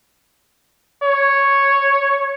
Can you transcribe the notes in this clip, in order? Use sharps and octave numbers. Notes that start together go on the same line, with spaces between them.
C#5